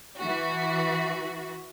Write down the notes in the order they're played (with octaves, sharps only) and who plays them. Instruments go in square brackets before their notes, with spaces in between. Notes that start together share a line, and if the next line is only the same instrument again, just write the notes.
[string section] E3 F#4